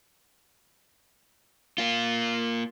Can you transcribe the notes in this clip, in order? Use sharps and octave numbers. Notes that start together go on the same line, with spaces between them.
A#3 F4